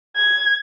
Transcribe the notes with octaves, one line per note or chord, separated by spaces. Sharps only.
G#6